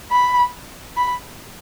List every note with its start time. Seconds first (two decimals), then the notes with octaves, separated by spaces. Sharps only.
0.11 B5
0.97 B5